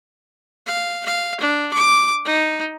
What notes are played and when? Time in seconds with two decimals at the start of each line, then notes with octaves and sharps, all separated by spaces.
0.67 F5
1.06 F5
1.40 D4
1.73 D6
2.25 D#4